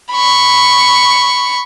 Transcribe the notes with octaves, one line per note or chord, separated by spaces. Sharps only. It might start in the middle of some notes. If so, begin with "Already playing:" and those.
B5 C#6